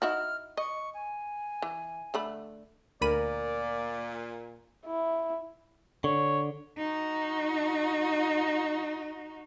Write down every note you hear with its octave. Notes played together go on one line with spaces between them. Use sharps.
D#4 E4 F#4 F6
D#5 C#6
G#5
E3
D3 A3 B5
D2 A#2 A#4 D5 B5 D#7
E4
D3 C#5
D#4 F#4